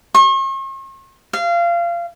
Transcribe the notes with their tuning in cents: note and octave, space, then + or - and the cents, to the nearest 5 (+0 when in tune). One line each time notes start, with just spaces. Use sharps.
C#6 -45
F5 -25